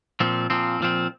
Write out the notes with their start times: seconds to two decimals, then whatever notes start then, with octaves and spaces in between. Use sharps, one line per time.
0.20 A#2 F3 C4
0.50 A#2 F3 C4
0.80 A#2 F3 C4